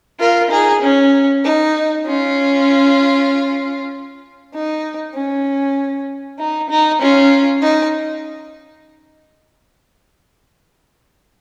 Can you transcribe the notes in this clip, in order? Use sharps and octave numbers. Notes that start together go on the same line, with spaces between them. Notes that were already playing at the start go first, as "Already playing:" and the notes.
F4 A#4
D#4 G#4
C#4
D#4
C#4 F4
D#4
C#4
D#4
D#4
C#4 F4
D#4